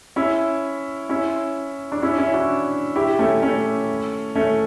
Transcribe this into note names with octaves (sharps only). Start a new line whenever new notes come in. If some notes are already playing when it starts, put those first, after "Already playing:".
C#4 E4
C#4 E4
D4
C#4 E4
C#4 E4
D4 F#4
E4 G4
A3 C#4
A3 C#4
A3 C#4